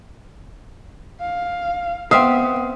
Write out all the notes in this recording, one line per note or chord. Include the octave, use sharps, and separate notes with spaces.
F5
B3 C4 E5 F5 D#6